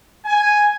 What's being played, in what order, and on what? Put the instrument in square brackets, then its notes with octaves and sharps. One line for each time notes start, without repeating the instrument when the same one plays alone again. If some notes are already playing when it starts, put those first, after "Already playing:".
[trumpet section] G#5